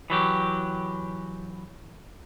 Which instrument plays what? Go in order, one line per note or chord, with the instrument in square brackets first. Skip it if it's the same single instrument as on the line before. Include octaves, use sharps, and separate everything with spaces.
[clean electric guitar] E3 F#3 G4